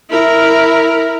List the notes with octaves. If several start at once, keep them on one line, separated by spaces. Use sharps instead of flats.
E4 A#4